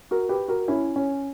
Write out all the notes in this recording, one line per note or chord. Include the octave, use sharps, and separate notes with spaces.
F#4 A#4
G4 B4
F#4 A#4
C#4 E4
C#4